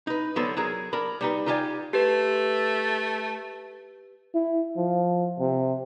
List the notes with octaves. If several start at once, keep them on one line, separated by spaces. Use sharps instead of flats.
D#4 B4
D3 F#3 B3 A4 C5
F#3 G#4 A#4
D4 A#4 B5
G3 D#4 B4
D#4 F4 G4 D5 E5 G#5
A3 G4 B4
E4
F3
C3